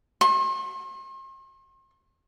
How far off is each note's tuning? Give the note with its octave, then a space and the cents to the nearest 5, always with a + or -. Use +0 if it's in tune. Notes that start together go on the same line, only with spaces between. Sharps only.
C6 +45